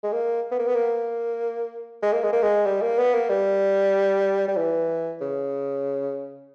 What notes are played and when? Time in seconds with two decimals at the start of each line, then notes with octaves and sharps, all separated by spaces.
0.03 G#3
0.13 A#3
0.51 B3
0.59 A#3
0.67 B3
0.75 A#3
2.02 G#3
2.13 A#3
2.24 G#3
2.33 A#3
2.43 G#3
2.66 G3
2.82 A#3
2.98 B3
3.14 A#3
3.29 G3
4.48 G3
4.57 E3
5.21 C#3